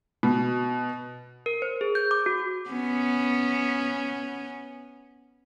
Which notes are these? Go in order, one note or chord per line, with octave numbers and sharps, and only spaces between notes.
B2
A#4
C5
G#4
G6
D6
F#4
B3 C#4